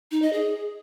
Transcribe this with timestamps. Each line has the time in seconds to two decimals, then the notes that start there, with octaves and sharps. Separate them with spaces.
0.11 D#4
0.22 D#5
0.33 G#4